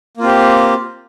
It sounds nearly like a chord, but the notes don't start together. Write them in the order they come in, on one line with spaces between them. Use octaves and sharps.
A#3 F4 C4 G4